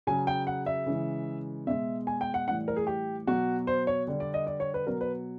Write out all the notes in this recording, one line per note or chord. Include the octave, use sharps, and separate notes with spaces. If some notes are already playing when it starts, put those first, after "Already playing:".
C#3 F#3 G#5
G5
F#5
E5
C#3 E3 G#3
B2 G#3 E5
G#5
G5
F#5
A2 E3 G3 F#5
A#4
G#4
G4
B2 F#3 F#4
C5
C#5
D3 G3
D5
D#5
D5
C#5
B4
B2 F#3 A#4
B4